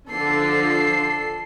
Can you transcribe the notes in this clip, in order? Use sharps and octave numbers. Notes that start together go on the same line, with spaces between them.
D3 F3 A4 C7